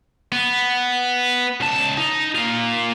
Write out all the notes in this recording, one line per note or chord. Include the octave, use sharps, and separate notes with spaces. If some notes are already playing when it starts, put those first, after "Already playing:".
B3
C#2 A5
D#4
A#3 F4